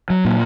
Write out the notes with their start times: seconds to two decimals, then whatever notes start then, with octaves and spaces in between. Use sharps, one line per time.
0.10 F#3
0.25 A#2